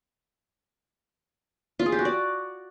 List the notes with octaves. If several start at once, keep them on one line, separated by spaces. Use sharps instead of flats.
F4
G#4
G4
F#4
D5